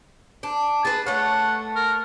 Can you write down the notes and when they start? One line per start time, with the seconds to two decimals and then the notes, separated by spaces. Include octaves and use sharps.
0.43 D4
0.85 G#4 B4 A5
1.06 A3 C#5 F#5
1.76 A#4